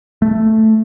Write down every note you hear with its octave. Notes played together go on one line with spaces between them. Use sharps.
A3